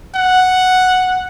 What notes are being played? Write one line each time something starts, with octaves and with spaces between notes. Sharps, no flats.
F#5